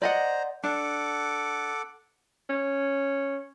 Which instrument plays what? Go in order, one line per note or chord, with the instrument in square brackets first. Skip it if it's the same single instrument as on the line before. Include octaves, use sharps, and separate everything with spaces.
[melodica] C5 A#5 [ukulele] D5 D#5 F#5
[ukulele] D4 [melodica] A4 F#5 D6
[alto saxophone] C#4